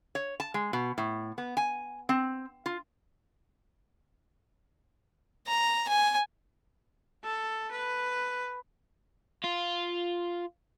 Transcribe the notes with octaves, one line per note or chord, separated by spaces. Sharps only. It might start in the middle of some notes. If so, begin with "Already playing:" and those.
C#5
A5
G#3
B2
A2
B3
G#5
C4
F4
A#5
G#5
A4
B4
F4